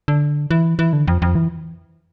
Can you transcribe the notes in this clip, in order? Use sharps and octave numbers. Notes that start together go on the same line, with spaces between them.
D3
E3
E3
D3
F2
F2
E3